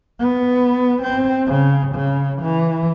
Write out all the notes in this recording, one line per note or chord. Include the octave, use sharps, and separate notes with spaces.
B3
C4
C#3
C#3
E3